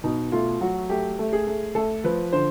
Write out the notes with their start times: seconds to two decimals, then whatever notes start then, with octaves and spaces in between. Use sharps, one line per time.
0.04 B2 D#4
0.32 A3 F4
0.61 F#3 F#4
0.89 A3 G4
1.19 A3
1.33 G#4
1.47 A3
1.75 A3 A4
2.04 F3 B4
2.33 D3 C5